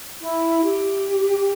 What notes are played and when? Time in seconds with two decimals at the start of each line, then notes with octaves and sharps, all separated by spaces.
0.20 E4
0.63 G4